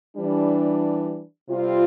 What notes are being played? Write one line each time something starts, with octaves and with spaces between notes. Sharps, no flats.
E3 G3 D4
C3 G3 C4 F4